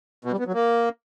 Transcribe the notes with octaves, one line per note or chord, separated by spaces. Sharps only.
B2
G3
B3
F#3
A#3